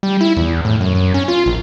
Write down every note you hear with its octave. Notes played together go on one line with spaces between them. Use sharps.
G3
E4
E2
A2
F#2
F#2
C#4
F4
A#1